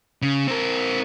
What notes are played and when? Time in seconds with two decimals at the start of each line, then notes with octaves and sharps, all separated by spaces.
0.22 C#3
0.47 C4 A#4